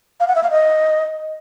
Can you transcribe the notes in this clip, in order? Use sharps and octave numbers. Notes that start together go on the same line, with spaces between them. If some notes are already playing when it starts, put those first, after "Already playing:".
F5
F#5
E5
F5
D#5